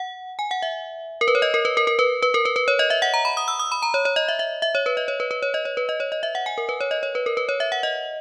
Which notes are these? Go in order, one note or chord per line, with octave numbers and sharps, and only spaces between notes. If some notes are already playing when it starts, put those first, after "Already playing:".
Already playing: F#5
G#5
F#5
E5
A#4
B4
C#5
D#5
A#4
B4
A#4
A#4
B4
B4
A#4
B4
B4
C#5
D#5
E5
F#5
A#5
B5
D#6
E6
D#6
B5
A#5
C#5
C#5
D#5
E5
E5
E5
C#5
B4
D#5
C#5
B4
B4
C#5
D#5
C#5
B4
D#5
C#5
D#5
E5
F#5
G#5
A#4
B4
C#5
D#5
C#5
B4
A#4
B4
C#5
E5
F#5
D#5